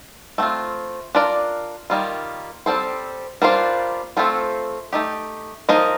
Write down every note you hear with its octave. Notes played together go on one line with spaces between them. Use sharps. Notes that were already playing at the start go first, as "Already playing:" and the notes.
A3 C4 F4
D4 F4 A#4 D5
D#3 G3 A#3 F4
G3 C4 F4 A4 C5
G3 A#3 D4 F4 C5
A3 C4 F4 A4 C5
A3 D#4 G4
F3 A#3 D#4 A#4 D#5